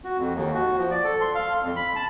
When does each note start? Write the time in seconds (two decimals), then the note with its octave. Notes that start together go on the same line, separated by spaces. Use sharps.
0.04 F#4
0.18 F2
0.34 D#2
0.54 F#4
0.78 F3
0.91 D5
1.04 A4
1.21 C6
1.35 F5
1.63 F2
1.76 B5
1.96 A5